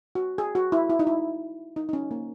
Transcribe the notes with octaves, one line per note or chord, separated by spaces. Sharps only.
F#4
G#4
F#4
E4
E4
D#4
E4
D#4
D#4
C#4
A#3